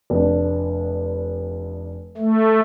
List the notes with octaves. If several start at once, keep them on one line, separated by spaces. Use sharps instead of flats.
F1 D4
A3